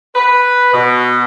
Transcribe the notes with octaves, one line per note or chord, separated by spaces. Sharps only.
B4
B2